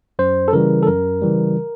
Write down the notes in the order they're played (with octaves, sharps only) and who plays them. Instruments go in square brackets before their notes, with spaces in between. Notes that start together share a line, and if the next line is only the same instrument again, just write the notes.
[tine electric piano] F#2 C5
A4
C#3 E3 G3 A#4
A4
F#2 A#4
C#3 E3 G3